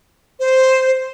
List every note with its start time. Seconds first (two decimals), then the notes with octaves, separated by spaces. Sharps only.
0.40 C5